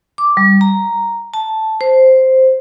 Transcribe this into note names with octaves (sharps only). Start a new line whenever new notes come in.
D6
G3
A#5
A5
C5